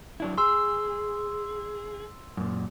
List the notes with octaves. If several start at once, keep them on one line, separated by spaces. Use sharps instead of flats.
F#3 D4 E4
G#4 C6 E6
F#2 A#2